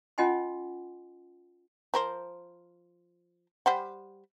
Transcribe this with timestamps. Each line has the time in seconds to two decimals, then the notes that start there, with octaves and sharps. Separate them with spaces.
0.18 C#4 F4 D#5 F#5 G#5 C6
1.94 F3 A#4 C5
3.66 G3 C5 F#5